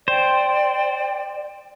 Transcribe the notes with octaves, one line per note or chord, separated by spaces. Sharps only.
C5 D5 G5